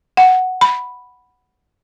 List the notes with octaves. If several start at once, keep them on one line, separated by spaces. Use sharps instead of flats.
F#5
B5